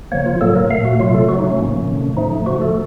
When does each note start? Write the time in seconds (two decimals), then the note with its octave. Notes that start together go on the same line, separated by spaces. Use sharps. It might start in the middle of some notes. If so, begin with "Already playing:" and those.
0.12 C#3 F3 A#3 C#5
0.26 F4
0.41 A2 F#3 A#3 A4
0.55 A#4
0.70 A#2 A3 F5
0.85 F#4
1.00 C3 F#3 A3 F4
1.14 A4
1.29 C#3 F#3 A3 F#4
1.38 D#4
1.49 C#4
1.58 A2 F3 A#3
1.88 C3 D#3 A3
2.17 A2 F3 A3 D#4
2.46 C#3 F3 A3 F#4
2.61 A4